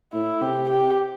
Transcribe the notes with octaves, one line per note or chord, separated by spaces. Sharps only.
A2 E4
C3 G4
G4